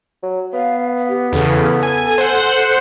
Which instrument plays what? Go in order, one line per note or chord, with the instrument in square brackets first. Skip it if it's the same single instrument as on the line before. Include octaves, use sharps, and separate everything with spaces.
[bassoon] F#3
[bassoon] B3 [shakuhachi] F5
[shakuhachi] G4
[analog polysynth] E2 C#3 [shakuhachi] A4
[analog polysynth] G#5
C5 F#5